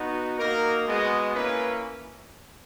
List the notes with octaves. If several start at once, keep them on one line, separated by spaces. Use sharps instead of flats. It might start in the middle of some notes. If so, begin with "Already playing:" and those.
Already playing: B3 D#4 F#4
A#3 D#4 F#4 A#4
G#3 B3 F#4 D#5
A#3 C#4 E4 B4